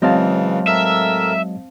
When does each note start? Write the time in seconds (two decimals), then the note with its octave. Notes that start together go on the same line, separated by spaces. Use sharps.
0.02 C#3 E3 F#3 G#3 C4 D#5 F5 A5
0.67 A2 A4 A#4 E5